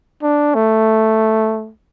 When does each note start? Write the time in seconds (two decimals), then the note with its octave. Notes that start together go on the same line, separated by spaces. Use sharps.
0.23 D4
0.55 A3